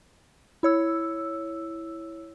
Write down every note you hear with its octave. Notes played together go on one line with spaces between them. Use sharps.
E4 C#5 E6